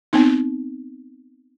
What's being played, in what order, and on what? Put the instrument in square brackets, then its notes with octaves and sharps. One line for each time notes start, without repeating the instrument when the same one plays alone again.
[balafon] B3 C4 D#4